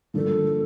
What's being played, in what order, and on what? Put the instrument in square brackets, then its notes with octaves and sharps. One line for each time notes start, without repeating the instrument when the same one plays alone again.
[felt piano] G2 D3 F3 A#3 D4 [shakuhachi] A4